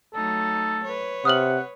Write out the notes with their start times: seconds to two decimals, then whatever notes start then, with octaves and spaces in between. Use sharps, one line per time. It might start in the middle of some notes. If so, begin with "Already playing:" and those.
0.14 F#3 A3 D#4 A4
0.84 B4 C#5
1.25 C3 F#5 D#6 F6 F#7